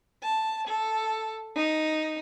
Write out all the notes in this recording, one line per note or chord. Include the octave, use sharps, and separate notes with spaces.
A5
A4
D#4